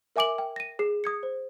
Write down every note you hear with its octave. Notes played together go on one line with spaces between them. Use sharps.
A#4 E5 G#5 D6 D7 F#7
G5
A#6 D#7
G#4 C7
D#6 G#6 C#7
C5